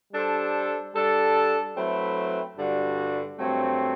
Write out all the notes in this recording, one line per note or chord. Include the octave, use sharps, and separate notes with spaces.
G3 D4 A4 C5
G3 D4 A4
F#3 A3 C4 E4 B4
G2 D3 G3 D4 F#4
G2 F#3 A3 C4